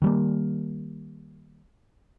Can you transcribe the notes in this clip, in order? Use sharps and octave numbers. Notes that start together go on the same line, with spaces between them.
D#3 G3 A#3